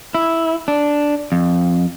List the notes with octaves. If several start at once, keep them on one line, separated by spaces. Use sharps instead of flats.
E4
D4
F2